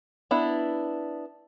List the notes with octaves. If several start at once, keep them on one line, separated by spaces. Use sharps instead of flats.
B3 D4 E4